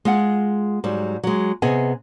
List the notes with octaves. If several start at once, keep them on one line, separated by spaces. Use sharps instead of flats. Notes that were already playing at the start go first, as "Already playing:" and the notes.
G#3 F4 F#5
G#2 F#3 G3
F#3 G#3
C3 B3 G#4 D#5 G#5